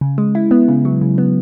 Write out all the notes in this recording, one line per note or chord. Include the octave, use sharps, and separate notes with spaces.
C#3
G#3
E4
B3
C#3
F#3
C#3
B3